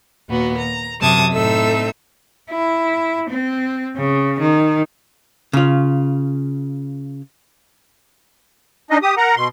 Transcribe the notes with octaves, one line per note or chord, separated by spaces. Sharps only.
D#2 A#2 B3 F#4
A#5
F#2 C3 A5 D#6 G#6
A2 C4 D#4 A4 E5 E6
E4
C4
C#3
D#3
C#3 F4
D4 D#4 D#5
G4 D#6
A#4 F#5 A#5
B2 C6